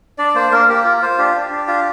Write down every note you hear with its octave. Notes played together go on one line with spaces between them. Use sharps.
D4 D5
A#3 C5
A#3 A#4
A#3 G4
F4 A#4
A#4
F4 C5
D4 G4
D4
D4
F4